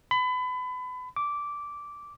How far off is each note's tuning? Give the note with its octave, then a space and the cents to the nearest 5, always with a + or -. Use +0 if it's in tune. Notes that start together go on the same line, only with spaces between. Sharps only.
B5 +30
D6 -10